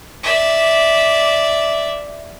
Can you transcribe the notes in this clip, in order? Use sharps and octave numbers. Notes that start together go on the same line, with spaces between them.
D5 E5